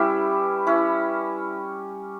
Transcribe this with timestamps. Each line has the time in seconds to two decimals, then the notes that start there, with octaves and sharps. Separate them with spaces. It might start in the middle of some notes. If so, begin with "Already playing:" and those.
Already playing: G3 C#4 E4 G4 B4
0.66 C#4 E4 B4